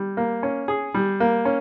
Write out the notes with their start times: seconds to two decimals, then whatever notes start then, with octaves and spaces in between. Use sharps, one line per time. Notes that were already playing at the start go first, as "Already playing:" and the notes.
Already playing: G3
0.17 A#3
0.43 C#4
0.68 G#4
0.94 G3
1.20 A#3
1.45 C#4